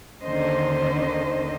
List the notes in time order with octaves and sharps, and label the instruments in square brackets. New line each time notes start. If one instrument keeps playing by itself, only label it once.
[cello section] D#2 D3 D#3 C#4 C5 D#5